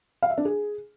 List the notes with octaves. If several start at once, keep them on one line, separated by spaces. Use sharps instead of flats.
F5
E5
D4
G#4